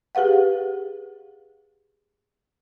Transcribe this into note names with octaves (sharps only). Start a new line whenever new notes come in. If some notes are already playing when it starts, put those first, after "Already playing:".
G4 G#4 B4 F5 F#5